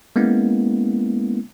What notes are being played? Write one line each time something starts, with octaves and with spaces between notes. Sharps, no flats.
G#3 A#3 B3 C#4 E4